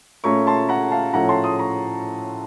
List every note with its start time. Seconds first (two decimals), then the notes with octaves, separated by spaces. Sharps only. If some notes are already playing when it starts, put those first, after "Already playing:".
0.24 A#2 A3 C#4 A#5 C#6
0.47 A5 C6
0.69 F#5 A#5
0.91 F5 A5
1.14 A2 F3 A3 C#4 F#5 A#5
1.29 A5 C6
1.44 C6 D#6
1.59 A#5 C#6